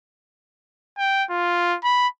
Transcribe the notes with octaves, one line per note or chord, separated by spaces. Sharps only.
G5
F4
B5